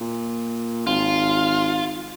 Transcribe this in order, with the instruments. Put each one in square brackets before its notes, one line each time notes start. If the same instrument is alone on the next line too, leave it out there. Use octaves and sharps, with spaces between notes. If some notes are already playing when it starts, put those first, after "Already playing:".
[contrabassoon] A#2
[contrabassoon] G#1 [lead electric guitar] F4